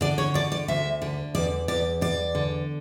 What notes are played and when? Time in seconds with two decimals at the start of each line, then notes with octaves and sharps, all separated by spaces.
0.01 D3 D5
0.18 C#5
0.34 D3 D5
0.52 D5
0.68 D2 E5
1.02 D3
1.35 E2 D5
1.68 E2 D5
2.01 E2 D5
2.35 D3